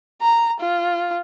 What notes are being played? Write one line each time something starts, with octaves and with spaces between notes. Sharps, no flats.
A#5
F4